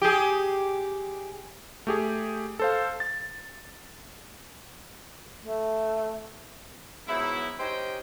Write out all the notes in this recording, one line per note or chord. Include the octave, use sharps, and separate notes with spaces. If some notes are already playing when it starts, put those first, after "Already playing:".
G4 G#4
A3 G4 G#4
A4 C5 F5
A6
A3
G#2 F#3 B3 E4
C#4 D#4 G4 C5 D#5 G5